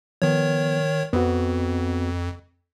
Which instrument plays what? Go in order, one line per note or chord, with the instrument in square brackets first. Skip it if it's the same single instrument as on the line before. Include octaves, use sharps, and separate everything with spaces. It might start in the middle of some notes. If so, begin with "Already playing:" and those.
[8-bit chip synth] D#3 C#5 [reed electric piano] F3 B3
[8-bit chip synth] F2 [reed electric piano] B3 C4 F#4